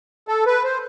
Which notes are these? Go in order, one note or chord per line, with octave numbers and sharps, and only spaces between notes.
A4
B4
C5